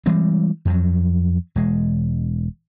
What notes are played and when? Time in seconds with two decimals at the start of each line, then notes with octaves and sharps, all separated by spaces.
0.06 E3 G3 G#3 C4
0.65 F2 F3 F#3
1.56 E1 G#3